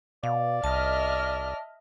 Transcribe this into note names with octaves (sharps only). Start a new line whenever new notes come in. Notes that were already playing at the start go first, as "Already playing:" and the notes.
B2 D5 F5
C2 D#5 E5 A5 F6